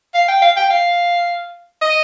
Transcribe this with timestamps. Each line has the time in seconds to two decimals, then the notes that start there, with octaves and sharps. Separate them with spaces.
0.14 F5
0.28 G5
0.42 F5
0.57 G5
0.70 F5
1.82 D#5